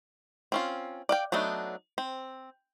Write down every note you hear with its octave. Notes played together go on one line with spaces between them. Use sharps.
C4 C#4 F4
D5 F5 G5
F#3 A3 B3 D4 D#4
C4